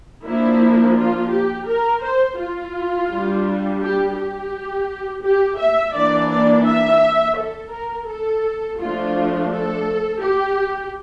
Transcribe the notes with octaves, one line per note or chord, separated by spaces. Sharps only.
F3 A#3 D4 E4
F4
G4
A#4
C5
F4
G3 D4
G4
G4
G4
E5
E3 A#3 D4 D5
D5
E5
A4
A#4
A4
F3 A3 D4 F4
A4
G4